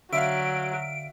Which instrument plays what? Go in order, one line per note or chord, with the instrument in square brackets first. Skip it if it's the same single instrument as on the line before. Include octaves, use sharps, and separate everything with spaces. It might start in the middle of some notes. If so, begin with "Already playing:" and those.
[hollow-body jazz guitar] D3 [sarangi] F#3 [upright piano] E5 F5 [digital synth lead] D7